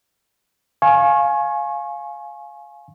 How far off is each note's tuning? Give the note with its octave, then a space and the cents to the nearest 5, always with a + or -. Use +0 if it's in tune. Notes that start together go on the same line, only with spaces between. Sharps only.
F5 +0 G#5 +20 C#6 -30